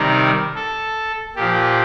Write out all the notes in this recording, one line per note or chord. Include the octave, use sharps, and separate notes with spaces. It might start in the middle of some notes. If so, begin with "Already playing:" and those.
Already playing: C3 D#3 G3 A#4
A4
A#2 F3 G4